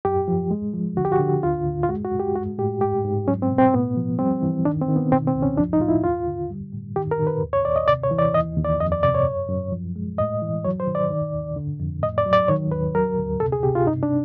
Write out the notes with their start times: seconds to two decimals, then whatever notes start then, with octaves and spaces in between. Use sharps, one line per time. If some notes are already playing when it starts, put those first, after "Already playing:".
0.05 F#2 G4
0.28 F3
0.51 G#3
0.73 F3
0.97 D3 F#4
1.05 G4
1.12 F#4
1.20 D3
1.43 D2 F4
1.66 D2
1.83 F4
1.89 G#3 F#4
2.05 F#4
2.12 F#2
2.20 G4
2.35 G#3 F#4
2.58 A2 G4
2.81 G#2 G4
3.04 G#2
3.27 F#3 C#4
3.42 C4
3.50 B2
3.58 C4
3.73 A2 B3
3.97 F3
4.19 G3 C4
4.42 E3
4.65 D#3 D4
4.81 C4
4.88 D#3
4.96 B3
5.12 B2 C4
5.27 C4
5.35 C#2
5.43 C#4
5.58 F3 D4
5.73 D#4
5.80 A2 F4
5.89 E4
6.04 D#2 F4
6.27 D3
6.50 G3
6.73 A2
6.96 D#3 G4
7.11 A#4
7.19 D#3
7.27 B4
7.42 D#2
7.53 C#5
7.65 D#2 D5
7.76 D#5
7.88 C3 D5
8.03 C#5
8.11 E3
8.18 D5
8.34 D#2 D#5
8.56 D#2
8.65 D5
8.80 F2 D#5
8.92 D5
9.03 C3 D5
9.15 C#5
9.26 F#2
9.49 F#2
9.72 F3
9.96 G#3
10.18 A2 D#5
10.42 E3
10.64 F#3 C#5
10.80 C5
10.87 D#3
10.95 D5
11.10 D#3
11.33 D#2
11.56 D3
11.80 F2
12.02 A2 D#5
12.18 D5
12.26 F#3
12.33 D5
12.48 D#3 C#5
12.71 D#2 B4
12.94 F#3 A#4
13.18 D2
13.40 C3 A4
13.52 G#4
13.63 C3 G4
13.75 F4
13.87 G2 D#4
14.03 D4